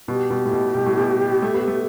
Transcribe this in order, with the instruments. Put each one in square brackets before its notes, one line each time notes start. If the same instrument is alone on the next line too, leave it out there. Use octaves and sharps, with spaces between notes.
[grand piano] B2 [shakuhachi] G4
[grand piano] B2
A2
B2
B2
A2
B2
A3
B3
A3